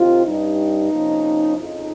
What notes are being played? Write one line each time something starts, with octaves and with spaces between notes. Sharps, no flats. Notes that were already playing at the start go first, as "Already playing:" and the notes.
Already playing: C3 D#3 C4 F4
G2 G3 C#4 D#4
C3 F3 A#3 C#4
F2 C#3 F3 D#4